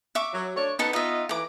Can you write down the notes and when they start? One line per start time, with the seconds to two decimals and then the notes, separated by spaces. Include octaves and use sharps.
0.15 E5 C#6 D6
0.33 F#3
0.56 A3 D4 C#5
0.79 B3 D#4 A4 A5
0.93 B3 D#4 F4 D#5 E5
1.29 E3 A3 A#5 D6